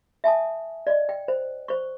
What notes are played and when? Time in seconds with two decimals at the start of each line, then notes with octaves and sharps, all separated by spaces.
0.24 E5 G#5 A5 D#6
0.87 D5 D#5
1.09 G5
1.28 C5
1.68 C5 C#6